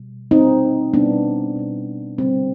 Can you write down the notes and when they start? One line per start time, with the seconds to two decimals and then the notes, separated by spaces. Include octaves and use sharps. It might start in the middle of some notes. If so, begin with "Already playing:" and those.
Already playing: B2 G3
0.31 B2 G3 C4 D#4
0.93 B2 G3 B3 D4
1.56 B2 G3
2.18 D3 G3 C4